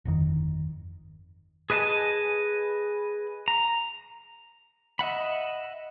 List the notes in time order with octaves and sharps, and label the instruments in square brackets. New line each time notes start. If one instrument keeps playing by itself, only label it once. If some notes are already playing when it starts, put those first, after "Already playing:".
[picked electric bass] G1 F2 D#3
[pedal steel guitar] G#4 B4 D#5 G#5 A5
A#5
D#5 E5 F#5 B5